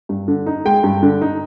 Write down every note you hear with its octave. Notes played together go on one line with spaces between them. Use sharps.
G2
D3
D#4
G#3 G5
G2
D3
D#4